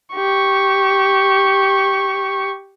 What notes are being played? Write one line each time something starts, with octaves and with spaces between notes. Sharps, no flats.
G4 C#6